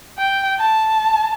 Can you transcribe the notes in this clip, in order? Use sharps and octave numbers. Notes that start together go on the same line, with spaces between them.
G5
A5